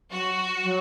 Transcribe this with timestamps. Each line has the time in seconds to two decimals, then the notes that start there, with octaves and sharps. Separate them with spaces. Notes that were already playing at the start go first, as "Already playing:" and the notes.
0.11 F#3 F#4
0.64 F#3